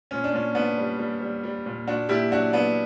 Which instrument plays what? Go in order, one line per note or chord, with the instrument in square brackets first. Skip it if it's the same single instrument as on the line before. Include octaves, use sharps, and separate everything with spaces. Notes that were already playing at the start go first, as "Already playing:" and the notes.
[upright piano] A#2 C#4
D4
A#2 C#4
A#2 B3 D4
G3
G3
G3
G3
A#2
A#2 D4 F#4
A#2 E4 G4
F#3 D4 F#4
F#3 B3 D4